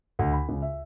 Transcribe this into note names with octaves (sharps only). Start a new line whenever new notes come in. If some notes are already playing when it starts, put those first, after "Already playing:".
D2
B5
C#2
E5